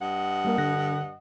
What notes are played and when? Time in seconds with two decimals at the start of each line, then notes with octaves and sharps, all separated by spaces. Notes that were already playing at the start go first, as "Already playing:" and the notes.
0.02 G2 D#5 F#5
0.45 G3 A#3 A#4
0.58 D3 F#6 A#6